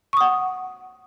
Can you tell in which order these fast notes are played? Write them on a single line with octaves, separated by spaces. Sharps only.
C#6 D#6 F#5